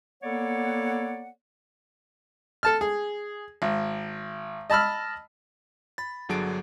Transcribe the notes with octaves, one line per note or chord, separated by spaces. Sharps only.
A#3 B3 A4 C#5 D5 F#5
A4 A5 F6
G#4
G#1
D#5 A5 B5 E6 F6
B5 A6
G1 D3 F#3 D4 G#4 D7